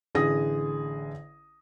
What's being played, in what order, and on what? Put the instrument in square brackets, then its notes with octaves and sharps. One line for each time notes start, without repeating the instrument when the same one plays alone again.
[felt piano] A1 D3 G#4 D#6 A#6